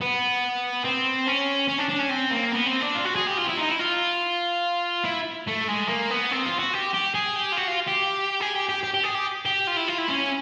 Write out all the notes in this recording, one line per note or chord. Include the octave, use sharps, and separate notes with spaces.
B3
C4
C#4
C#4
D4
D4
C#4
C4
A#3
B3
C4
D4
F4
F#4
G#4
G4
F4
E4
D#4
E4
F4
E4
A3
G#3
A#3
B3
C4
F4
F#4
G4
G4
G#4
G4
F4
F#4
F4
G4
G#4
G4
G4
G4
G4
G#4
G4
G4
F4
E4
F4
E4
C#4